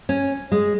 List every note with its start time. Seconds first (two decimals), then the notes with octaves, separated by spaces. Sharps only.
0.09 C#4
0.52 G#3